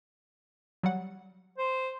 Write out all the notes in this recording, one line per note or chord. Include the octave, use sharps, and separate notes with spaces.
F#3 G3 F#5
C5